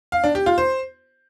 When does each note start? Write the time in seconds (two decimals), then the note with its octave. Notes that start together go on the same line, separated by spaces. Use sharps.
0.12 F5
0.24 D4
0.35 G4
0.46 F4
0.58 C5